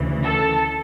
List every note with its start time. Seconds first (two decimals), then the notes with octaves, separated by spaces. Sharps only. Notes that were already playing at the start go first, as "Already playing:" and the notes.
Already playing: D2 C#3 E3
0.23 A4